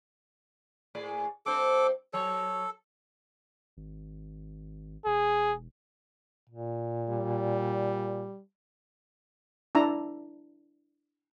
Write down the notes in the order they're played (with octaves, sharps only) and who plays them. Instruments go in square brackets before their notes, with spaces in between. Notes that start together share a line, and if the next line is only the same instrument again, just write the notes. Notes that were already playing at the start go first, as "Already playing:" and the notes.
[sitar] A2 G#4 D5
[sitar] G2 C4 C5 [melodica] A4 D6
[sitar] F#3 C#5 [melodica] A4
[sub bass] G#1
[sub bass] E1 [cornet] G#4
[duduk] A#2
[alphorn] G3
[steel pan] D4 E4 A#5